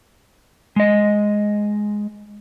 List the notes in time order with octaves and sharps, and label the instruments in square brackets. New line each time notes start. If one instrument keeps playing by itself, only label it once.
[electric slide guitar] G#3 D#5